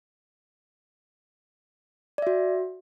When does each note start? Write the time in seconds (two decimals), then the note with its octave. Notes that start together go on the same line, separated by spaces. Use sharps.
2.18 D5
2.22 E5
2.27 F#4